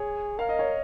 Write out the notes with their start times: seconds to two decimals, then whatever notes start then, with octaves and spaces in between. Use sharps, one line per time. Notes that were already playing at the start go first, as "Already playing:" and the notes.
Already playing: G#4 C#5
0.38 A#4 F5
0.49 D#5
0.59 C#5